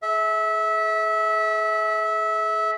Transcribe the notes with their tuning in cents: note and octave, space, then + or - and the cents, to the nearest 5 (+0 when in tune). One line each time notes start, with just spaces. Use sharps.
G#4 +35 E5 -20